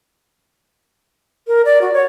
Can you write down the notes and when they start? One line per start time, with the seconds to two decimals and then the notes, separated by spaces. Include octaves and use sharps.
1.47 A#4
1.65 D5
1.82 F#4
1.94 C#5